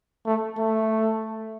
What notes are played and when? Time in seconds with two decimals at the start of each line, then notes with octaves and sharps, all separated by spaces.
0.26 A3
0.58 A3